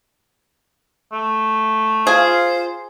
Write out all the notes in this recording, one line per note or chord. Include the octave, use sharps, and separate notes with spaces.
A3
F4 G#4 C5